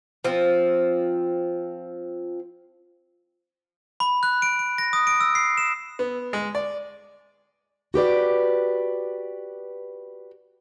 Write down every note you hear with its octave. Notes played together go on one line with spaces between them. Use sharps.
F3 C4
B5
F#6
D7
D7
A#6
D#6
D7
E6
C7
E7
B3
G#3
D5
F#4 G4 B4 D5